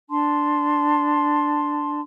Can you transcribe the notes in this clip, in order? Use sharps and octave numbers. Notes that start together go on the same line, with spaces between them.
D4 A5 C6